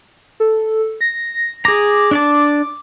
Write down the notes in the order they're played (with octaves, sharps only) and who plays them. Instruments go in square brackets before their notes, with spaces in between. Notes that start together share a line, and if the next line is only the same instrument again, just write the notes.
[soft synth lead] A4
A#6
[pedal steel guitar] G#4 A#5 [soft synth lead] D6
[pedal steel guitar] D4 D5 A5